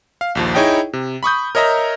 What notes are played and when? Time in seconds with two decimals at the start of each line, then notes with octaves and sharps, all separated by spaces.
0.21 F5
0.35 A#1 D#2 F3
0.55 D#4 E4 G#4 C#5 D#5 G5
0.93 C3
1.23 B5 C#6 D#6 G6
1.55 A#4 C#5 D#5 E5 A#5